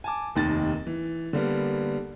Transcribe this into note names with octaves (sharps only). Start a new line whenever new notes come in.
G#5 A5 D6
F1 D#2 D#3 A6
E3
D3 G3 A#3 B3